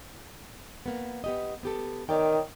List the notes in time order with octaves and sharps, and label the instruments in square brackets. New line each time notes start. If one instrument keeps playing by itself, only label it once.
[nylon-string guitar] A#3 B3
B3 G4 D#5
B3 G4 A4
[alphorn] D#3 [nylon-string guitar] C#5 D5 G5